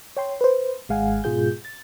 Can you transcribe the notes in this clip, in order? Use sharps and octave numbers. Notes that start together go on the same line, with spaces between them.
C#5 G5 C6
B4 C5
G#1 G#3 F5 F#5 G#5
G#2 B2 F4 G#4 G6
A6